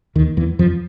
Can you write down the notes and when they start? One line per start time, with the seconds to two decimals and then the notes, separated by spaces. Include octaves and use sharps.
0.15 D#2 D#3
0.37 E2 E3
0.59 F2 F3